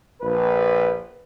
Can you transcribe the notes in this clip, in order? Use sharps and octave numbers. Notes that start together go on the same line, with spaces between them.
A#1 B4